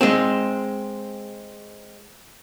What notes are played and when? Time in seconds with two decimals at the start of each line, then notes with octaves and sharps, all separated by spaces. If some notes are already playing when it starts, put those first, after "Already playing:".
0.01 G#3 C4